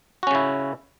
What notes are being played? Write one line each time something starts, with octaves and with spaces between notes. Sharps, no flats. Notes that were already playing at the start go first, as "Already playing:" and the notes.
C#3 C#4 E4 F#4